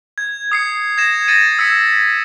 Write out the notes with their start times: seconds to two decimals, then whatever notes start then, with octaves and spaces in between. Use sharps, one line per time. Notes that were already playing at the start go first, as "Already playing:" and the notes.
0.18 G#6
0.52 D#6 C7 C#7
0.98 G#6 A#6 E7
1.28 A6 A#6 C#7 D#7
1.59 E6 B6 C#7